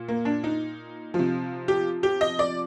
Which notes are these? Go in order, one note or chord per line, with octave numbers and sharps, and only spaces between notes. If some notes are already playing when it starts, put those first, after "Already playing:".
Already playing: A#2
A#3
D4
D#4
C3 F3
G4
G4
D#5
D5